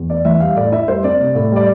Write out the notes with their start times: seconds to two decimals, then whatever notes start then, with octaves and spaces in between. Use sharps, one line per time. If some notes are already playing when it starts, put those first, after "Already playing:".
Already playing: E2
0.09 B3 D5
0.25 E3 E5
0.40 G3 F5
0.56 A2 D5
0.72 E4 E5
0.88 G3 C5
1.04 C4 D5
1.20 C3
1.35 A2
1.52 G3 D5